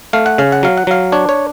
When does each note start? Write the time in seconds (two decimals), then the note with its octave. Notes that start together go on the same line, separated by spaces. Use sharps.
0.13 A3 F5
0.26 F#5
0.38 C#3 F5
0.52 F#5
0.63 F#3 F5
0.78 F#5
0.87 F#3 F5
1.12 D4 C#5
1.29 C#5